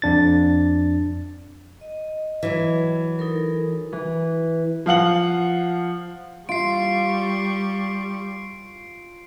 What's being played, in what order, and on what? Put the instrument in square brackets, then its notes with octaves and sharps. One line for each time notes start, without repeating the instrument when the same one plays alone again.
[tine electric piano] F2 D4 A6
[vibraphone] D#5
[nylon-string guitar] E3 F#3
[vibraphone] D#4 A4 A#4
[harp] E3
[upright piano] F3 F5 F#5 F#7
[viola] G3 C#6 [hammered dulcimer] F4 [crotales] C7 D7